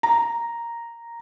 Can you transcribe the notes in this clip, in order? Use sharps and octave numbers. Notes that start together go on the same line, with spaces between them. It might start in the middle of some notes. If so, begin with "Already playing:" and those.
A#5